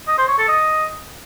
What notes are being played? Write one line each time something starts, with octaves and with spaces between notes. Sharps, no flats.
D#5
C5
C#5
A4
D#5